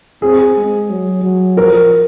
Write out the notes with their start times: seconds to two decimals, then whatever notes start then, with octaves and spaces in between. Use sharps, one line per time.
0.22 C4 G#4
0.57 G#3
0.90 F#3
1.23 F#3
1.57 F3 A#4